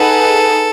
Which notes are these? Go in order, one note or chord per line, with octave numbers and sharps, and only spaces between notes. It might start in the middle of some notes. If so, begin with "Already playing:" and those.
Already playing: D#4 G#4 A4 B4 F#5